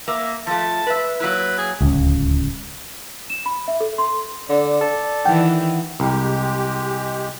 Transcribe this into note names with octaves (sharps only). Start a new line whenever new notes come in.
A#3 E5
F3 A3 A5
B4 E5
F#3 A#3 E4 B4
G#4
D1 C#2
E7
B5
E5
A4
C6
D3 D5
A4
D#3 E3 F#5 G5
C2 G#3 G4